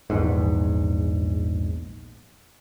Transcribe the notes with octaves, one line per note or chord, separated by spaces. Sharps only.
A#1 E2 G#2